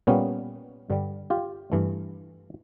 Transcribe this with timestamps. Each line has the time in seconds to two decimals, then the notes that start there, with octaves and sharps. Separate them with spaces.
0.07 A#2 G3 A#3 B3 C#4
0.90 G2 D3 G3
1.30 F4 G4
1.72 G2 E3 A3